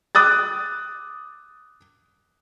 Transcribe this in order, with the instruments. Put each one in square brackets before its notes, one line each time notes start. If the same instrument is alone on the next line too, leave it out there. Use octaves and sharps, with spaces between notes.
[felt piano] D6 D#6 F#6 A6